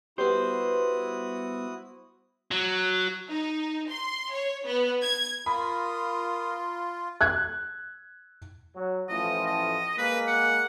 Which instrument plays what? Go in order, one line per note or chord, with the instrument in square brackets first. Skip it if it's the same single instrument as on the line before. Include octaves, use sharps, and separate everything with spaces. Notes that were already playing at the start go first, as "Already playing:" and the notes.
[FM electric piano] G3 B3 [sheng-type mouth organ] E4 F#4 D#6 [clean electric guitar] C5
[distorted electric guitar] F#3
[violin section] D#4
C6
C#5
B3
G#6
[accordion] F4 [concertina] A#4 D#6 [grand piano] B5
[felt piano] F#6 G#6
[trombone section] F#3
[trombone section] A1 A2 F3 [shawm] D#5
[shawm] D#5
[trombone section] G#3 A#3 [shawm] B4
[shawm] F#5